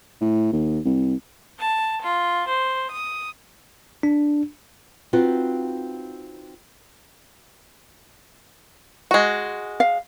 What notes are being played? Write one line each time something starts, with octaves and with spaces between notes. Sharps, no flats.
A2
D#2
C2
A5
F4
C5
D#6
D4
C4 D#4 F4 F#4 B4
G#3 F#4
F5